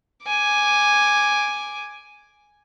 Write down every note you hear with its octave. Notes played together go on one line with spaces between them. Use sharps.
G#5 D6